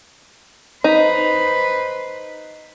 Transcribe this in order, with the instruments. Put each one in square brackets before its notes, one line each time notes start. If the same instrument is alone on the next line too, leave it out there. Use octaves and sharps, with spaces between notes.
[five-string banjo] D#4 [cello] B4 C5